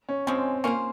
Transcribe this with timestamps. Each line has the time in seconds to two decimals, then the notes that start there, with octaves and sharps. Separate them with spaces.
0.09 C#4
0.27 F3 G#3 C4 C#4
0.64 A#3 C#4 F4 C5